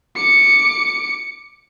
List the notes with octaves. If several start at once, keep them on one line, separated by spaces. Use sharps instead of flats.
D6 C#7